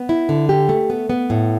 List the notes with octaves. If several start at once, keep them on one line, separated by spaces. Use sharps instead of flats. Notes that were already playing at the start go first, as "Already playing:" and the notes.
Already playing: B3
E4
D3
G4
A3
B3
B3
A2